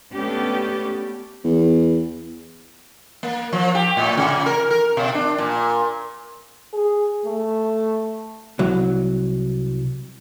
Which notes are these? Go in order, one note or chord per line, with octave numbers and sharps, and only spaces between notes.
A3 B3 C#4 D4 G4
E2
A#3
F3
G4
A2
C3
A#4
A#4
B2
D4
A#2
G#4
A3
C2 F#3